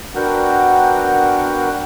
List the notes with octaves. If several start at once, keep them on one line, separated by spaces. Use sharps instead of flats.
B3 D4 F#4 A#4 F#5 G5